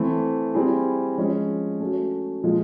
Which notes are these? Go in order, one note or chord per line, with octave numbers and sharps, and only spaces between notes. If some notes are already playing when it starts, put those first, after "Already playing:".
Already playing: E3 A3 C4
G3 C4 E4 G#4
F3 G#3 C#4
A3 C#4 F#4
A#2 F3 G#3